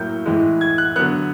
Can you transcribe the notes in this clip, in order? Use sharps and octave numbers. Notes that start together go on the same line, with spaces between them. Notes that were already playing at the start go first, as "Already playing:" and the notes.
Already playing: A2 F#3 A#3 G6
A2 E3 G#3
G#6
F#6
D3 F#3 B3 F#6